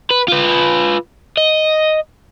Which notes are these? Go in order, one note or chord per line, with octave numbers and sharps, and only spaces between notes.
B4
F4 B4
D#5